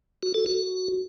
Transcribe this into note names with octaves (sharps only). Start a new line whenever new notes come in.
F#4
A4
F#4